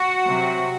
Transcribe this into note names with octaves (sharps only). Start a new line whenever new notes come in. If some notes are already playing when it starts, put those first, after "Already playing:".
Already playing: F#4
C3 F#3